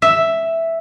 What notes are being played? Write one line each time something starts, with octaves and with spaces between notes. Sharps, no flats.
E5